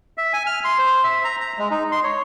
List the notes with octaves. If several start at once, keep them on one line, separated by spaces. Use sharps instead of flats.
E5
G#5
F6
C6
C5
E5
A#5
A#5
G#3
D#4
C6
C#5